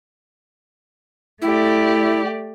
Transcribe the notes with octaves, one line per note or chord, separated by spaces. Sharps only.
A3 E4 G4 D5